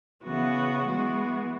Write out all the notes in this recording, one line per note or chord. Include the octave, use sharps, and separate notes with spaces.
C#3 E3 B3 F#4
E3 G#3 B3 F#4